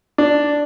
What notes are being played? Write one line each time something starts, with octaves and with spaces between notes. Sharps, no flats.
D4